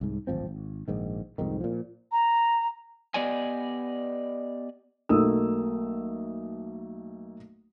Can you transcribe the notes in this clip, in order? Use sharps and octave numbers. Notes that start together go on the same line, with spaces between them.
C2 G#2
D1 G#1 F3 C4
G#1
A#1 G#2 D#3
C2 F2 G#2 D#3
A#2 F3
A#5
B3 G4 D5 D#5 G#5
B1 A3 A#3 D#6 E6